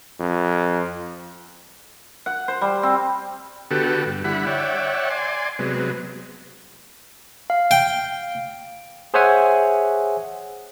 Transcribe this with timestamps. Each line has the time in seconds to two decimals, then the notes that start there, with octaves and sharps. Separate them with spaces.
0.20 F2
2.26 F#5
2.48 C5
2.61 G3
2.83 C4
3.71 D3 B3 F#4 G4 A4
4.06 G2
4.24 D3 G3 E4 F#5 B5
4.47 C#5 D5 E5 F#5 G5
5.10 D5 G#5 C6
5.59 C3 F#3 G#3 B3
7.50 F5
7.71 G5
9.14 G#4 C5 C#5 E5 F#5 G#5